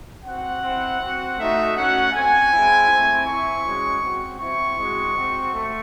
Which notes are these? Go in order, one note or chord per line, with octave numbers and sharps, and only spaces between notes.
C4 F#4 F#5
C4 E4
C4 F#4
A3 D#4 F#4 E5
A3 C#4 F#4 F#5
C4 F#4 G#5
G#3 C4 E4
A3 C4 E4
C4 E4 C#6
G#3 C#4 F#4
C4 F#4
C4 E4 C#6
G#3 C4 F#4
C4 F#4
A3